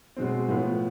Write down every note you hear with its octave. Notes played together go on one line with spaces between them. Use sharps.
B2 G#3 C4
A2 F3 B3